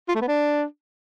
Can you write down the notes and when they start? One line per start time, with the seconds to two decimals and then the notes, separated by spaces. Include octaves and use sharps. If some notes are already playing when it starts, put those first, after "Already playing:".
0.08 F4
0.15 A3
0.21 B3
0.28 D4